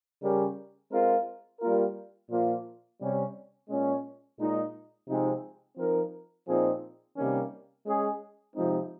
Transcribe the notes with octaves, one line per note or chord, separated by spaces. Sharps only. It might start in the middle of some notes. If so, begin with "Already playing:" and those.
C#3 G3 C#4 G4 A#4
G#3 C4 F4 A#4
G3 A#3 F4 A#4
A#2 F3 A#3 F4
C3 G3 C#4
A#2 G#3 C#4
A#2 G#3 D#4
C3 F3 G#3 C4 D#4
F3 C4 D#4 A#4
A#2 F3 C4 D#4 G#4
C3 D#3 G3 A#3 C#4
G#3 C#4 G#4
C3 F3 G#3 C4 D#4